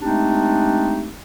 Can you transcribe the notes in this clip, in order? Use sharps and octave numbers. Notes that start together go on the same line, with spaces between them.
G#3 A3 C4 D4 D#4 G4